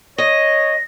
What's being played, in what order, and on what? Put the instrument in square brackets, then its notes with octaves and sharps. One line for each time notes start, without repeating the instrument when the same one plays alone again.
[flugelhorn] C#5 [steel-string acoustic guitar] D#5 [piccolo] A#6